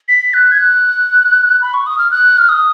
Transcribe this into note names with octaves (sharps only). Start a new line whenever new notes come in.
B6
F#6
G#6
F#6
B5
C#6
D#6
F6
F#6
F6
D#6